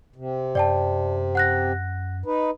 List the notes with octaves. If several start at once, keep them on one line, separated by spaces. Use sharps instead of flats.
C3
F#2 D5 G5 A5
F#5 F#6 A#6
D#4 B4